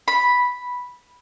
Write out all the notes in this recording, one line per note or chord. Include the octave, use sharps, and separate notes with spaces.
B5